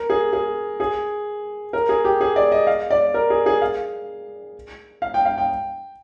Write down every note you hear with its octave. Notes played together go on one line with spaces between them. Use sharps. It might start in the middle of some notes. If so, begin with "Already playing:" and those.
Already playing: A#4
G#4
G#4
G#4
A#4
G#4
G4
G#4
D5
D#5
F5
D5
A#4
G#4
G#4
F5
F5
G5
F5
G5